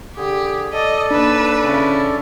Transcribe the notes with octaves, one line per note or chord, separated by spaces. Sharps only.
D3 G4 G#4
A4 D5 D#5
D#2 D4 B4 E6
C#3 C#4 E4